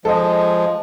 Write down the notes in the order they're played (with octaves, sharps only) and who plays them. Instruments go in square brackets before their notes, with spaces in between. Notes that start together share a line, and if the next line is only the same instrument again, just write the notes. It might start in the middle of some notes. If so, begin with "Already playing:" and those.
[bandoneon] F3 G#3 [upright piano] A4 D#5